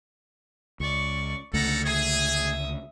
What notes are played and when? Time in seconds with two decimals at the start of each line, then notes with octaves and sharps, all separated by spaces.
0.80 C#2 D5 C#6
1.53 C#2 D3 G3 A3 A4 F#5 A#5
1.85 G#4 E5 D#6